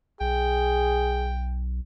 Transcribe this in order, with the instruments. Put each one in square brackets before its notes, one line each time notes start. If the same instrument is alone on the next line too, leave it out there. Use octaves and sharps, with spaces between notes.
[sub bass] B1 [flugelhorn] G#4 [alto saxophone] G5